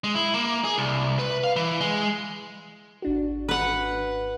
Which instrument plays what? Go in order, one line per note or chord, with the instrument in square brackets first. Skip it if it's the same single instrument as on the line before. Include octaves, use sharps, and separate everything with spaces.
[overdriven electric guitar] G#3
E4
A#3
G#4
C2
B4
F5
E3
G#3
[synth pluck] G#1 D4 F#4
[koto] B4 F#5